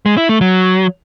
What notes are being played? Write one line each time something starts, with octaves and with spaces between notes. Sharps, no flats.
G#3
E4
A3
F#3